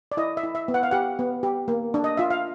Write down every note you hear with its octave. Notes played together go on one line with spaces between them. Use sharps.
D5
E4 D#5
E5
E4
E5
B3
F#5
F5
G4 F#5
B3
G4
A#3
D4
D#5
F4 E5
F5